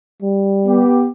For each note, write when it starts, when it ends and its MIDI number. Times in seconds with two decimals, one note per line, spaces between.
0.22 0.83 55
0.66 1.07 59
0.66 1.07 67